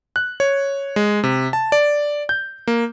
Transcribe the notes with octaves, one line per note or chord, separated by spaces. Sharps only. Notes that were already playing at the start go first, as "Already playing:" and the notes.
F#6
C#5
G#3
C3
A5
D5
G6
A#3